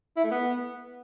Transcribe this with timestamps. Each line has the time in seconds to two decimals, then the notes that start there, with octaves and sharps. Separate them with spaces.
0.17 E4
0.24 A3
0.31 B3